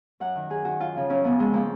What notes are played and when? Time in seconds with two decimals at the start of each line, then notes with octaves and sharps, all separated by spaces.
0.20 F#2 F#5
0.35 D#3
0.50 F#2 G#4
0.65 D#3 F#4
0.80 F#2 F4
0.95 C#3 F3
1.10 F#2 C#4
1.24 C#3 F3 B3
1.39 F2 G#3
1.53 F3 A#3